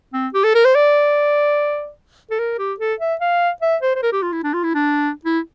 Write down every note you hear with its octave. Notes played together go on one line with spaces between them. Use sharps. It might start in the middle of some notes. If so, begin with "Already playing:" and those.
C4
G4
A4
A#4
C5
D5
A4
A#4
G4
A4
E5
F5
E5
C5
C5
A#4
G4
F4
E4
D4
F4
E4
D4
E4